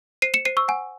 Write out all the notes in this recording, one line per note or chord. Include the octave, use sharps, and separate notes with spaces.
C5 C7 D#7
C#7 E7
C5 C7 D#7
C#6 E6
F#5 G#5